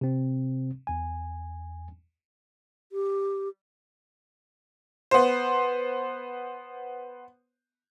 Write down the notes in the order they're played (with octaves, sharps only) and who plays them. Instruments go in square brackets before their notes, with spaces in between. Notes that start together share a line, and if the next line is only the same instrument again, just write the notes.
[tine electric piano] C3 C4
E2 G#5
[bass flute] G4
[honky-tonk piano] B3 C5